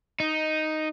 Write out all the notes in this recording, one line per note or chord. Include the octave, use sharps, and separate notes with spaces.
D#4